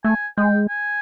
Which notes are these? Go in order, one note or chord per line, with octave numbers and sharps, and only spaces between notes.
A3 G#5
G#3 G5
G#5